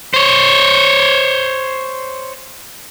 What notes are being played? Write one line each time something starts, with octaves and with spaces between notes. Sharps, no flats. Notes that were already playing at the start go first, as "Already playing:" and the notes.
C5 C#5